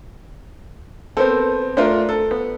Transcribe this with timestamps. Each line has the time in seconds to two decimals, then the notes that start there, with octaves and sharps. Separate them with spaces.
1.17 B3 C4 A4 A#4 C5
1.77 A3 D4 F4 A#4 C5
2.09 A4
2.31 B3